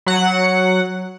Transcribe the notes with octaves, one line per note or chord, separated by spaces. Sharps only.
F#3 F#5